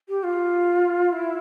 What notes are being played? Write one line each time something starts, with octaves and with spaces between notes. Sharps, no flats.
G4
F4
E4